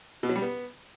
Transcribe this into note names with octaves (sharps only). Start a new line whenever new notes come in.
B2
F#3
G3
B3